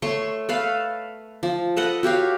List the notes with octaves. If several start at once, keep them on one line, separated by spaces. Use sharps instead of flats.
A3 C#5 C6 C#6
A4 B4 F5
F3
A4 B4 D#5 F#5
F#4 G4 C#5 F5